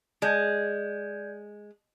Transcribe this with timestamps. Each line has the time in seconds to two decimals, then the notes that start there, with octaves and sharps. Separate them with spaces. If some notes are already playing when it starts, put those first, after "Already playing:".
0.22 G#3 D5 G6 G#6